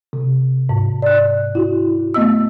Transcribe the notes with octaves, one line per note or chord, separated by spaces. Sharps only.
C3
G#2
D5 F#6
E4 F#4
A3 B3 D#5 E6